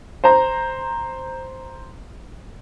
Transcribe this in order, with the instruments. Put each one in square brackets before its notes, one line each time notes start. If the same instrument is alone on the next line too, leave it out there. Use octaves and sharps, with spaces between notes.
[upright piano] C5 A#5